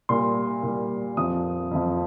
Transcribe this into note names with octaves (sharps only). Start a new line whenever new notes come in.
A#2 G3 C6
A#2 G3
F2 F3 D#6
F2 F3